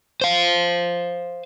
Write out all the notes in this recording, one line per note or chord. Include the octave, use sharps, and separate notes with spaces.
C5 F5